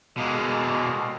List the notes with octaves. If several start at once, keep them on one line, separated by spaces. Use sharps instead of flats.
D#2 B2 D3 G#3 A#3